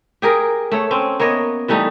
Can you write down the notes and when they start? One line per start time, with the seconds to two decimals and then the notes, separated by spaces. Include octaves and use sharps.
0.22 G4 G#4 A#4
0.72 A3 C#5
0.91 C4 C#4
1.20 A#3 B3 C#5 D#5
1.68 E3 G3 A3 D#4